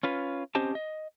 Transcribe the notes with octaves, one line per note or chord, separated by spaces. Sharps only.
C#4 F4 B4
C4 C#4 G4 C5 D#5 A5
D#5